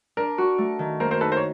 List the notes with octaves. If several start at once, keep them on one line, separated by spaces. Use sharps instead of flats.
D4 A#4
F#4
A3
D#3
A#3 A#4 C5
A#4 C5
D#4 A4 B4
A#4 C5
C#5